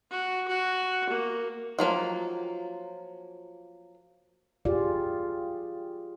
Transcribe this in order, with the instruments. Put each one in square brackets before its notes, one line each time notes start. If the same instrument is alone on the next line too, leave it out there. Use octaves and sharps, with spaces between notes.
[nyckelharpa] F#4
F#4
A#3
[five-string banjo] F3 F#3 A#3
[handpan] F4 G4 G#4 D5 F5